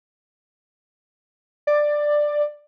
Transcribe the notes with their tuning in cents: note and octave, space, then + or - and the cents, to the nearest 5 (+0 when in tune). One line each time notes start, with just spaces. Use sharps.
D5 +10